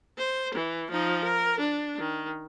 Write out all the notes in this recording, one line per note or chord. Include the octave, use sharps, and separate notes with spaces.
C5
E3
F3 D#4
A#4
D4
D#3